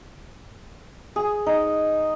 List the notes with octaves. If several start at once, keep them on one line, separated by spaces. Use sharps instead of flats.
G#4
D#4